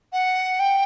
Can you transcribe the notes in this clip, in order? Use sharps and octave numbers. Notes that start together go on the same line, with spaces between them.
F#5
G5